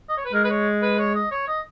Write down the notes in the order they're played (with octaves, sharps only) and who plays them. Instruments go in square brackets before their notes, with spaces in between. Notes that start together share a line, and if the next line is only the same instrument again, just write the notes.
[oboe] D#5
C#5
B4
[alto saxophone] G#3 [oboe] A#4
[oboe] B4
C#5
B4
C#5
D#5
C#5
D#5